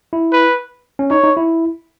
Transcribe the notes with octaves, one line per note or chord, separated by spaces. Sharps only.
E4
B4
C#4
D#4 C#5
D#4
E4